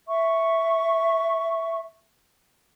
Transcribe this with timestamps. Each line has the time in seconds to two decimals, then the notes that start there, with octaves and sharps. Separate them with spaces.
0.09 E5 C#6